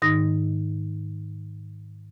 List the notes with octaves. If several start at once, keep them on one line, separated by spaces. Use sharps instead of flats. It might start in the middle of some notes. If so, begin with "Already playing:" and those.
G#2 D#3 D#4 D#6 A#6